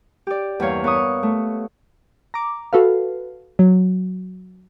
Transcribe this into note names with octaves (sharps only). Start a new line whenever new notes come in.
G4 D5
E2 G2 A#3 C#5 F5
B3 A#4 C#6 D#6
A3
A#5 D6
F#4 A4 B4 F5
F#3